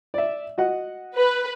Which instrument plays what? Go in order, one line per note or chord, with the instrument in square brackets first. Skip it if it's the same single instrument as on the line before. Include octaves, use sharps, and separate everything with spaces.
[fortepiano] D5 E5
F#4 D#5 F#5
[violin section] B4